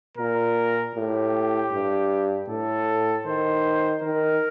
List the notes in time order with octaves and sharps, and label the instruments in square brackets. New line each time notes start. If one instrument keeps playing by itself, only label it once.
[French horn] A#2 [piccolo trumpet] A#4
[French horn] A2 [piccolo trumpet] G4
[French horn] G2
[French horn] A2 [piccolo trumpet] A4
[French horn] D#3 [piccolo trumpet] C5
[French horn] D#3 [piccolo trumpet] A#4